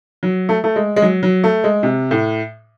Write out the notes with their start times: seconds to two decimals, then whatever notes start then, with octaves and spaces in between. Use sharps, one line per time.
0.23 F#3
0.49 A3
0.64 A3
0.76 G#3
0.96 G#3
1.02 F#3
1.23 F#3
1.44 A3
1.64 G#3
1.83 C3
2.11 A2